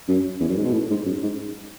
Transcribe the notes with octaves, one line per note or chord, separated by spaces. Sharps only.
F#2
E2
F#2
G#2
B2
A2
G#2
F#2
G#2